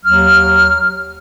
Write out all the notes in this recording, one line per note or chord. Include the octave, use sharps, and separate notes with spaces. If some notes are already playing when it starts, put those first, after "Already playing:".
D#2 F#3 F6